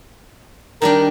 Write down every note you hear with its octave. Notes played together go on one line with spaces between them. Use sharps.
D#3 G3 D4 A#4